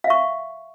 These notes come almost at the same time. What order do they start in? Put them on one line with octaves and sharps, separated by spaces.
F5 E5 C#6